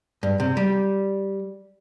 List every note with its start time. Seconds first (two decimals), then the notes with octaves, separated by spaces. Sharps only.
0.23 G2
0.40 C3
0.57 G3